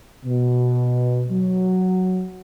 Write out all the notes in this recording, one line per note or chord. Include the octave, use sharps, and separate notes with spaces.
B2
F#3